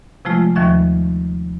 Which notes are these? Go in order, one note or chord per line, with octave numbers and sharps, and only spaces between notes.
C3 F3 G#3 A3 F4
D#2 D#3 F3 E5 C#6 A6